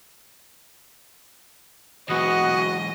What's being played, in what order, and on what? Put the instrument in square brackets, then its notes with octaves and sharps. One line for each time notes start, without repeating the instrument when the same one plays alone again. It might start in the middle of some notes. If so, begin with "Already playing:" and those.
[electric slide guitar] E3 F#3 G#3 [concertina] B3 F#5 D#6 [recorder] F#4 [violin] D#5